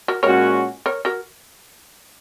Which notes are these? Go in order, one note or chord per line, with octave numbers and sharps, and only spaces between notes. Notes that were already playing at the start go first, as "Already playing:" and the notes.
F#4 A#4
A#2 G#3 C#4 F#4 A#4 C#5
A#4 C#5
F#4 A#4